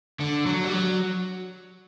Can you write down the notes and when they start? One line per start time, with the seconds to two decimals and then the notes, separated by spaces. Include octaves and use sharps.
0.21 D3
0.46 F#3
0.64 G3
0.72 F#3